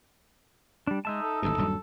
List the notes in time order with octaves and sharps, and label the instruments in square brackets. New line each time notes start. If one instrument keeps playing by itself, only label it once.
[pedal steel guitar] G3 D4
[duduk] G#3 [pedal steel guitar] D#4 E5 A5
[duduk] A4
[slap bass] G#1 D2 G2 [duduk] A4
[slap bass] D#1 G2 F#3